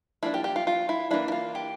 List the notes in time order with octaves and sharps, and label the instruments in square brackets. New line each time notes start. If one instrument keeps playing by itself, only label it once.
[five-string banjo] F3 A#3 D4 E4
G4
G4
F4
F4
E4
E3 A#3 D4 E4
E4
F4
G4